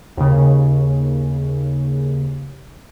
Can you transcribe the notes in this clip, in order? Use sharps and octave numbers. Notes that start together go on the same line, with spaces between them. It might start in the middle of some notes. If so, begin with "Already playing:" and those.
D#2 C#3